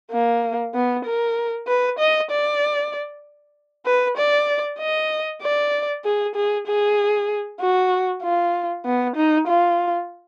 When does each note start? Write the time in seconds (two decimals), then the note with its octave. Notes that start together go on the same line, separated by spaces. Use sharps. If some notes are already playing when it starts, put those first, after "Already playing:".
0.12 A#3
0.75 B3
1.05 A#4
1.67 B4
1.99 D#5
2.30 D5
3.86 B4
4.17 D5
4.79 D#5
5.42 D5
6.05 G#4
6.35 G#4
6.67 G#4
7.60 F#4
8.23 F4
8.85 B3
9.16 D#4
9.47 F4